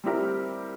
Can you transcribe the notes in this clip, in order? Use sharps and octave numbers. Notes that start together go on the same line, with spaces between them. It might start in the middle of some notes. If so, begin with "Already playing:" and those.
G3 C4 E4 G4 A#4